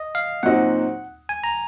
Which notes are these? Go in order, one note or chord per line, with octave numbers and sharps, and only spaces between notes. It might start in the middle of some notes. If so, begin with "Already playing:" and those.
Already playing: D#5
F5
A#2 F#3 C4 D#4 F#4 F#5
G#5
A#5